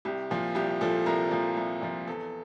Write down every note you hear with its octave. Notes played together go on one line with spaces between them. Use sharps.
C2 G4
A#2 F3
C2 G4
A#2 F3 A4
C2 A#4
A#2 F3
C2
A#2 F3
E2 A4